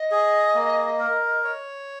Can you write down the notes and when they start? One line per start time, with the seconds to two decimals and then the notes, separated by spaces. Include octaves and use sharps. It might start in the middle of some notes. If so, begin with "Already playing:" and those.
Already playing: D#5
0.11 G#4
0.55 A#3
1.00 A#4
1.44 C#5